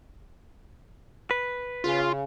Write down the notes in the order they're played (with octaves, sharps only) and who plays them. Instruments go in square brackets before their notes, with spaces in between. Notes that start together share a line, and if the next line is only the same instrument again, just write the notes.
[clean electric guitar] B4
[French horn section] C#3 [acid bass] F4